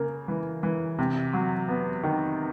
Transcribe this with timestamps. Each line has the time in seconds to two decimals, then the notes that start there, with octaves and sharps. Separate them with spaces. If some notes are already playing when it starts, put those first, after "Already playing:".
Already playing: C#3 A#3
0.28 E3
0.63 E3
0.99 C3
1.33 F#3
1.68 B3
2.04 D#3